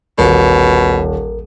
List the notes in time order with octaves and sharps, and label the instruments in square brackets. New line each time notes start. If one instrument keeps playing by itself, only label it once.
[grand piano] D#1 [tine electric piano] A1 A#4 [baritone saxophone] B2